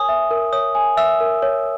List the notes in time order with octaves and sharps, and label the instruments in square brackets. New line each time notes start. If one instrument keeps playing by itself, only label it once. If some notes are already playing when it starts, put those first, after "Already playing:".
Already playing: [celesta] A#4 C#5 G#5 [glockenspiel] D#6
[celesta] E5
A#4
[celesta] C#5 [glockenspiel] D#6
[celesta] G#5
[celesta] E5 [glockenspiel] E6
[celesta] A#4
C#5